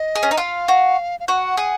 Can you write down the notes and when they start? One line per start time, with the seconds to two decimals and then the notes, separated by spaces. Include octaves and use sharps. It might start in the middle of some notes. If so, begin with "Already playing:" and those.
Already playing: D#5
0.15 G#4
0.23 C#4
0.31 D#4
0.38 F4 F5
0.68 F#4
1.20 F5
1.28 F#4 F#5
1.57 G#4